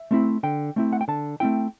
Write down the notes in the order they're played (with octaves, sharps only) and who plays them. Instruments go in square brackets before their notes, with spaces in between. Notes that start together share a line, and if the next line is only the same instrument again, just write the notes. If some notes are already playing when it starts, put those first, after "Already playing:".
Already playing: [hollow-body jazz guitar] E5
A3 C4 E4
D3 G5
A3 C4 E4
F#5
G5
D3 A5
A3 C4 E4 G5